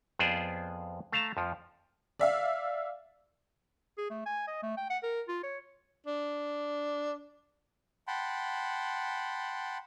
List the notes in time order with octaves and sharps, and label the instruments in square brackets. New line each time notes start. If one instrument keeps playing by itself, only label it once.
[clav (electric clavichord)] F2 B3 F4 G#4 C5 D5
A3 F5 A5 A#5
F2 F3
[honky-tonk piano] D5 E5 F5
[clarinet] G#4
A3
G#5
D#5
A3
G5
F#5
A#4
F4
C#5
[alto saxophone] D4
[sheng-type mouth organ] F#5 G5 A5 B5 C6